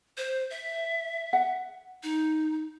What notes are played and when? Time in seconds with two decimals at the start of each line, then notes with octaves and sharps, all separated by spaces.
0.17 C5
0.50 E5
1.33 F#5
2.03 D#4